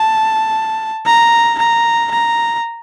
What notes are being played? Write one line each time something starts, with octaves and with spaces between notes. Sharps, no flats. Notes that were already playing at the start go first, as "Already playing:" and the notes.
Already playing: A5
A#5
A#5
A#5